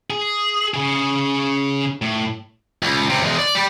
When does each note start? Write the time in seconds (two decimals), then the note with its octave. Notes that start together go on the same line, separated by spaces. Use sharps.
0.10 G#4
0.74 C#3 G#4
2.02 A2
2.83 C#2
3.10 C#2 C3
3.23 E2 G#3
3.39 D5
3.55 G3 G4